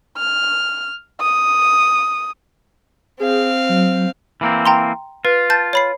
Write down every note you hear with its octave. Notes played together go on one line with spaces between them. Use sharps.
F6
D#6
C4 G#4 F5
F#3
E3 A#3 C4
G5 A#5 C6
F4 B4
A5 G6 A6
C#5 B5 C7